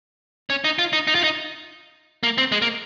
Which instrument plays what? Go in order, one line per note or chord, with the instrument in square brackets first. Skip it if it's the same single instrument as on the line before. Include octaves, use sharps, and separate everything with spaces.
[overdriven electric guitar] C#4
D#4
F4
D#4
D#4
F4
D#4
A#3
C4
G#3
A#3